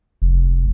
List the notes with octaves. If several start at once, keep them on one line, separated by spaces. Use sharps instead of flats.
F1